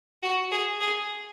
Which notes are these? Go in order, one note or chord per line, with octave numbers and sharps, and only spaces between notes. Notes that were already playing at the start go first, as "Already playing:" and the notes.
F#4
G#4
G#4